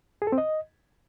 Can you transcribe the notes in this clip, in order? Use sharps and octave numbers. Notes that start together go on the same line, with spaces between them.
G#4
A4
C4
D#5